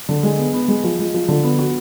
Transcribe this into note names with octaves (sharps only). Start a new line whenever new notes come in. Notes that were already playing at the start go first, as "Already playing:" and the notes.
D3
G#3
B3
B3
G#3
F3
G#3
F3
D3
B3
F#4